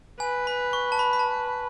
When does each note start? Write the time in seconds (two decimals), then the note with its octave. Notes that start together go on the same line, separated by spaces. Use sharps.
0.20 B4 G#5
0.47 B5
0.73 C#6
0.92 A5
0.99 B5
1.13 B5
1.19 A5